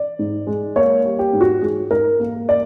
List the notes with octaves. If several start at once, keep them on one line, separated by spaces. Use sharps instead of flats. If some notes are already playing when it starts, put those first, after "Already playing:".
Already playing: D5
G#2
G#3
A#3 C#5
G3
G4
G#2
F#4
G#2 G#4
G#2 A#4
A#3
D5